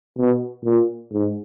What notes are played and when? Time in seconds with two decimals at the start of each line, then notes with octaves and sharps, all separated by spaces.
0.17 B2
0.64 A#2
1.12 G#2